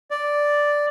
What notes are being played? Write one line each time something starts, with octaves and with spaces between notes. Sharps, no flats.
D5